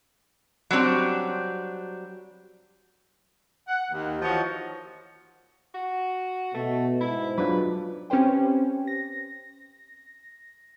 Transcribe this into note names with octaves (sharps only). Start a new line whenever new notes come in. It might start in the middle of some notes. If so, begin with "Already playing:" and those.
F#3 G3 C4 D4
F#5
D#2
E3 F3 F#4 C#5 D#5
F#4
B2 A3
G#2 E4
F#3 D4 F4 B4
C4 C#4 G4 B4 C5 G5
A#6